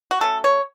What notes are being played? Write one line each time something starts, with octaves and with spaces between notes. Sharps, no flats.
F#4
F#3 A3 C#4 A4
C#5